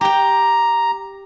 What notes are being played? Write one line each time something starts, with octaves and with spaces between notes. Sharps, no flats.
G4 G5 A#5